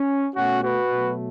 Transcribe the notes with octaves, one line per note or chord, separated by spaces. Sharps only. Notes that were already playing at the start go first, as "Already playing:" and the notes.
Already playing: C#4
B2 A3 C#4 F#4
F#4 B4
B2 F#3 A3